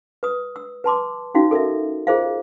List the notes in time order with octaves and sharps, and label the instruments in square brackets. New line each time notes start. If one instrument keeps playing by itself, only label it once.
[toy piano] B4 D#6
E6
B4 A5 C6 D6
C#4 D#4 F#4 F5
A4 A#4 D#5 E5
F4 G#4 A#4 C5 D#5 F5